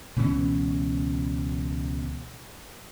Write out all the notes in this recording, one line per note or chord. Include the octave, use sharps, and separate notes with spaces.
C#2 B2 E3 C#4